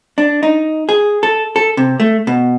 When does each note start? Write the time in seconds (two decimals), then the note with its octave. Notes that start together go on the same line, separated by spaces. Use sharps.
0.18 D4
0.43 D#4
0.89 G#4
1.23 A4
1.56 A4
1.77 C3
2.00 A3
2.27 B2